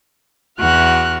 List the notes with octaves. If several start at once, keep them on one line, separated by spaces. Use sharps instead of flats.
E2 F#4 F6 F#6